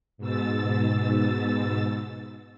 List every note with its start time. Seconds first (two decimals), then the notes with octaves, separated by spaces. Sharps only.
0.18 G#2 B2 E6 A6